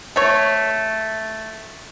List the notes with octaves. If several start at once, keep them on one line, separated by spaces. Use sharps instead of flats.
A3 C#5